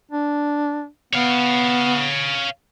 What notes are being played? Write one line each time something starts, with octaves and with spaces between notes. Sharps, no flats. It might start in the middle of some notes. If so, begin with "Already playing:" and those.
D4
B3 C#5 F5